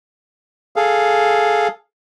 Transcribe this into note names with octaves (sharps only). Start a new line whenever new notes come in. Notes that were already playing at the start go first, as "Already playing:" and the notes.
G#4 A4 F5